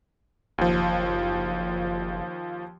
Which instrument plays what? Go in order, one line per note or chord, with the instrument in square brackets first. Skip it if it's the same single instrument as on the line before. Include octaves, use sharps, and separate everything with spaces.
[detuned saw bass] F#1 [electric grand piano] D#2 F3